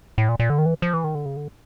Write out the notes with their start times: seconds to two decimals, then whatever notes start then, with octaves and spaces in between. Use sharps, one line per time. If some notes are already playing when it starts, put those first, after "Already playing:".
0.18 A2
0.29 A#2
0.40 A#2
0.50 D3
0.58 D#3
0.66 E3
0.82 F3
0.94 E3
1.04 D#3
1.15 D3
1.26 C#3
1.37 D3